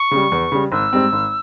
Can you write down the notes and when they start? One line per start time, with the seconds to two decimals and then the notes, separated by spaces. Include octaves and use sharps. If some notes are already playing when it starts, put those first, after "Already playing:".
Already playing: C#6
0.11 C#3 G3
0.32 E2
0.52 C#3 G3
0.72 G#1 E6
0.93 G#2 G3 C4
1.12 G#1